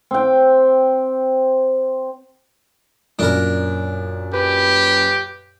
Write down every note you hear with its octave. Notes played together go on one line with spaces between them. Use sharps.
C4 G5
F#2 A#2 D4 A#4
G4 B4